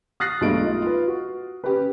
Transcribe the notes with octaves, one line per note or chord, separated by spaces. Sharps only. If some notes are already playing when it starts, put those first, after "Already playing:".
D#6 F6 F#6 A6 A#6 C7
B1 G2 F#3 G#3 A3 D7
D#4 F4
F4 B4
F#4
C#4 G4 B4